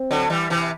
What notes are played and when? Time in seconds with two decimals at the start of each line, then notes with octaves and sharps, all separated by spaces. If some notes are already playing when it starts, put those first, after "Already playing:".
Already playing: C4
0.11 D3 F#3
0.30 E3 G3
0.50 C3 E3